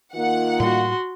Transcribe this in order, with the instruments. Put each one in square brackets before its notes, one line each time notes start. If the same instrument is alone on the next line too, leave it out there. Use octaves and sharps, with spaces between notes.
[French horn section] D#3 A#3 F4 [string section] F#5
[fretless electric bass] A2 G3 [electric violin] F#4 C6